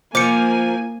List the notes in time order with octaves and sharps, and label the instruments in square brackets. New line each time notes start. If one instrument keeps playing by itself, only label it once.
[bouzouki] F3 [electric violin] A#3 G#5 [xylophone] D6 C#7